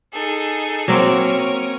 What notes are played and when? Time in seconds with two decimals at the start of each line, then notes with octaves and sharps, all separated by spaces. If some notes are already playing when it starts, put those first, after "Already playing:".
0.12 D#4 G#4 A4
0.88 F#3 A#3 C4 C#4 A#4 C#5